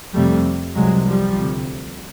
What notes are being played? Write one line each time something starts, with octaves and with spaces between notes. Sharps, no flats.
F2 C3 G3 A3
C2 C3 F#3 G#3
F3 G3
D2 C3